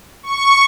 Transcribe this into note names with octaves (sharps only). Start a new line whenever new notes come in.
C#6